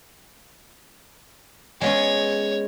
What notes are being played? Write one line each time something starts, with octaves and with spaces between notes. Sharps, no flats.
G#3 B3 C#4 C#5